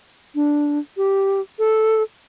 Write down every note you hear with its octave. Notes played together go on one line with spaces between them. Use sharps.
D4
G4
A4